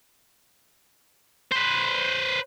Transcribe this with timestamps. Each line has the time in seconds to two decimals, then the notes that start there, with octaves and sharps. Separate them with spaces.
1.52 B4 C5